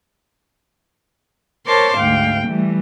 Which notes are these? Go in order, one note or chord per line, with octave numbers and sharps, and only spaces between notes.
A#4 C5 C#5 A5 C6 D6
D2 G#2 F5 G5
E3 G3 A3